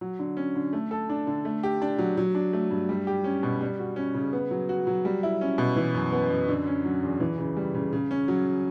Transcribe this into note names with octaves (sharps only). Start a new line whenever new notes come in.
F#3
D3
C#4
D3
A3
A4
D4
D3
A3
G4
D4
F#3
F#3
D4
A3
G2
G3
G4
C#4
B2
G3
F#4
C#4
C#3
B3
F#3
F#4
F#3
G3
E4
C#4
B2
E3
F#2
B3
F#2
D3
C#4
F#3
E2
E3
C#3
G3
C#3
C#3
C#4
F#3